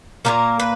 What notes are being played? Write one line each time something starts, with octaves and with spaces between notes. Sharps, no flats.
A#2 F3 A#3 A#4
B4